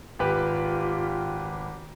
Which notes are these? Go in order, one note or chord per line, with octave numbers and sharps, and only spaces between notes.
G#1 F4 G4 B4